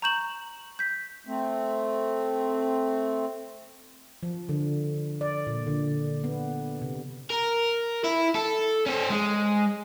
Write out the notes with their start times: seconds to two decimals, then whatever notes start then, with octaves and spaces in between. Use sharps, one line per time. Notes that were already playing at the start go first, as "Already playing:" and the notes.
0.02 A#5 C#6 G6 E7 F#7
0.79 G6 B6
1.27 A3 C4
4.23 F3
4.49 D3
5.21 D5
5.47 A#2
5.67 D3
6.24 B3
6.82 C3
7.30 A#4
8.04 E4
8.35 A4
8.86 C#4 C5
9.10 G#3